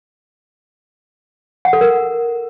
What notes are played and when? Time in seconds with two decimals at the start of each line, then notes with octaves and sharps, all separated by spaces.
1.65 F#5
1.73 A4
1.81 A#4